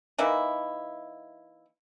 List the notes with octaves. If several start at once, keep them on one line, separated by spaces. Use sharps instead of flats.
E3 A#3 D#4 E4